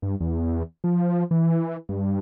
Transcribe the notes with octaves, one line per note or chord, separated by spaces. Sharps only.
G2
E2
F3
E3
G2